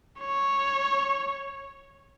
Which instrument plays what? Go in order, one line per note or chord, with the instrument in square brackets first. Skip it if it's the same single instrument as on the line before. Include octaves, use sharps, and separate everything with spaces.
[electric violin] C#5